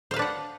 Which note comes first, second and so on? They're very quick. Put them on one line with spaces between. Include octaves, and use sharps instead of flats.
C5 F5 B4 D4 F#5